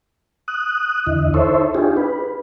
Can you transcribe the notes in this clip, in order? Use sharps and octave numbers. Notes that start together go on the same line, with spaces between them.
D#6 F#6
E2 D3 E4 D#5
D#4 E4 A4 C5 C#5 E5
D4 D#4 F4 G4 G#4
B4